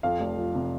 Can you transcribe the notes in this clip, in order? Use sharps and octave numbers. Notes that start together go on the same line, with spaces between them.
F2 F5
F1
F3
C3